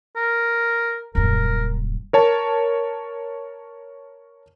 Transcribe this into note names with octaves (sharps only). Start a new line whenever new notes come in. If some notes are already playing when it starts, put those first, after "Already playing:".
A#4
D#1 F#2 A#4
A#4 C#5 A5